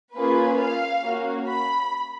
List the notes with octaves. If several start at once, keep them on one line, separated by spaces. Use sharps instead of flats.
A#3 C#4 F4 G#4 B4
F5
A#3 C#4 F#4
B5